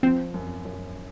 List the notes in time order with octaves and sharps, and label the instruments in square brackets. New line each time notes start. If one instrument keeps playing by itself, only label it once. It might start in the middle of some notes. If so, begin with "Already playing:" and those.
[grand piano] F3 [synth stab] C4
[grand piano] F#2
F#2